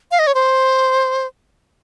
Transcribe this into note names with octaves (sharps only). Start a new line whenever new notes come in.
F5
D#5
C#5
C5